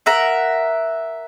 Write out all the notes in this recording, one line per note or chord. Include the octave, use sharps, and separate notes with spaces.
A#4 E5 F#5